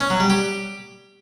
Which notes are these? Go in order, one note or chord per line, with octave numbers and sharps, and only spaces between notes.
C#4
F#3
G3
G4